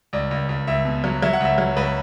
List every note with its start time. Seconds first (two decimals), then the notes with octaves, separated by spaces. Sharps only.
0.13 C#2 D5
0.31 C#2
0.49 C#2
0.67 C#2 E5
0.85 B2
1.04 F#3
1.22 F#3 E5
1.33 F#5
1.40 C#2 E5
1.58 F#3
1.76 C#2 B4